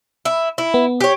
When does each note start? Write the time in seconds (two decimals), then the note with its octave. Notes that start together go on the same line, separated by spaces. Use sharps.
0.25 E4
0.58 E4
0.74 B3
1.00 G4 C#5